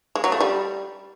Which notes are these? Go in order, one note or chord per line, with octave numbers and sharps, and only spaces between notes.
G#3
F#3
A3
G3